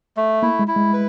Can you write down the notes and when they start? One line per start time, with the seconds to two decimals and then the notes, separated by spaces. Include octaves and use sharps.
0.17 A3
0.42 A#3 E4
0.59 G#3
0.68 E4
0.76 G#3
0.94 B4